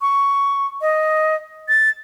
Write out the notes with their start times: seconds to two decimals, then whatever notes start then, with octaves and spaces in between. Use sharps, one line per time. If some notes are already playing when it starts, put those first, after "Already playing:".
0.01 C#6
0.81 D#5
1.68 A6